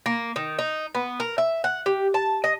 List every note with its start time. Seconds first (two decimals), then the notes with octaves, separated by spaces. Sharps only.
0.06 A#3
0.36 D#3
0.59 D#4
0.95 B3
1.20 A#4
1.38 E5
1.64 F#5
1.86 G4
2.14 A5
2.44 D#5